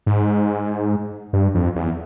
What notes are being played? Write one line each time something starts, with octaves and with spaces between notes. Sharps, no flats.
G#2
G2
F2
E2